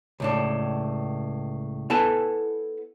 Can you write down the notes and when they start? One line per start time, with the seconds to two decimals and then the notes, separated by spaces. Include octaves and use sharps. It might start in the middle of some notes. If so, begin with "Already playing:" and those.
0.20 C#2 A2 D4
1.90 B3 E4 A4 B4 G#5 A5